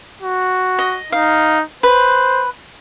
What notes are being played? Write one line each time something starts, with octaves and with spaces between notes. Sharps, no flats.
F#4
D#5
D#4 F5
B4 C5